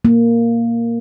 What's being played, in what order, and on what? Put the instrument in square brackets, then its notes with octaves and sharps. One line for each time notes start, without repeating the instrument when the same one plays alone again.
[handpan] A#3